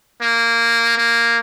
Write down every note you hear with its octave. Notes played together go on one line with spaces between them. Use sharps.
A#3
A#3